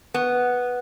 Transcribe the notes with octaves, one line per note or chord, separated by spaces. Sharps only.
B3